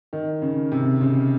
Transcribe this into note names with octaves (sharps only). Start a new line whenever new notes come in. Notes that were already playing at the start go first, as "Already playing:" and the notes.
D#3
C#3
C3
C#3